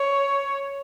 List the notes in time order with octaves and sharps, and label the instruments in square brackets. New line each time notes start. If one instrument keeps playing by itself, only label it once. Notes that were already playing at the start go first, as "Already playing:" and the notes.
Already playing: [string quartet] C#5